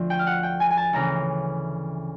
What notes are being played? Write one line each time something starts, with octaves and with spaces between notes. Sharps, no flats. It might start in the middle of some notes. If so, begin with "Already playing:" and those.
Already playing: D2 D3 F3
G5
F5
F#5
G5
G#5
G#5
A5
D2 C#3 E3 A#5